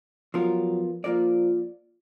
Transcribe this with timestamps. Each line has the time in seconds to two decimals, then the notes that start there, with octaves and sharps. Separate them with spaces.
0.34 F3 F#3 B3 F4 A#4
1.04 F3 A#3 F4 A#4 D5